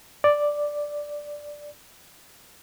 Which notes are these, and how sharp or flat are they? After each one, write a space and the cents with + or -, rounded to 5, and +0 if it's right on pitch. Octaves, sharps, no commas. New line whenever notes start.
D5 +0